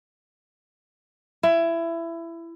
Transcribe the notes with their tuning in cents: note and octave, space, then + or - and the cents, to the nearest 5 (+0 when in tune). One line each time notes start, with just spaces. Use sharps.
E4 +20